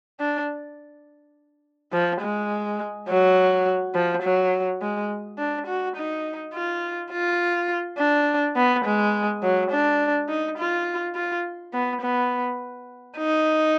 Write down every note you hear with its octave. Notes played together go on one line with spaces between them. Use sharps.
D4
F3
G#3
F#3
F3
F#3
G#3
D4
F#4
D#4
F4
F4
D4
B3
G#3
F#3
D4
D#4
F4
F4
B3
B3
D#4